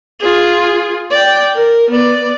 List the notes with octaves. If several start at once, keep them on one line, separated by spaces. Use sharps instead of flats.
F4 G#4
D5 G5
A#4
B3 D5